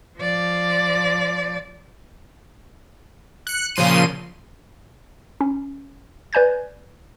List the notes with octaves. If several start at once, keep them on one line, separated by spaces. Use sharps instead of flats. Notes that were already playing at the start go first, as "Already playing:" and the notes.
F3 D5
F#6 C#7
A#2 C#3 F3 C6 D#7
C#4
B4 D5 G#5 G6 G#6